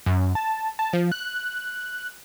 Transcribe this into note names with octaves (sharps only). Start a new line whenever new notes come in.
F#2
A5
A5
F3
F#6